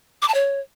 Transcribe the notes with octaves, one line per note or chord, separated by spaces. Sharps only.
D6
A5
C#5